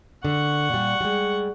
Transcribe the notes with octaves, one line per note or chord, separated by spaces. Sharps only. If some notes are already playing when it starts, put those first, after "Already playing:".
D3 F#5 C#6
A#2 G3
G3 G#3